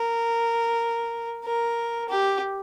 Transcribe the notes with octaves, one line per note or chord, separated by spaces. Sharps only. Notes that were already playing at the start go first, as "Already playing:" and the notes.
Already playing: A#4
A#4
G4